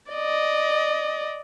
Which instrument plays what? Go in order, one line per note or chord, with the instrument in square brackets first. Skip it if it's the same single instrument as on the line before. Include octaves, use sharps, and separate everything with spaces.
[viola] D5 D#5